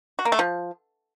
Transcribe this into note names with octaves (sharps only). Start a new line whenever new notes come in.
F#4
A#3
A3
F3